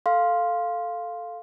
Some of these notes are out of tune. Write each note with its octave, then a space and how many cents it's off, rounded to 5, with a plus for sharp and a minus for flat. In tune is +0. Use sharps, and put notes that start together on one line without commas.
A4 +0 F5 +0 C6 +0